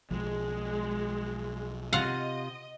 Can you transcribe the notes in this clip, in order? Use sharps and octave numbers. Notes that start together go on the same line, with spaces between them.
B1 F3 G#3
C3 F4 D#5 F5 F#5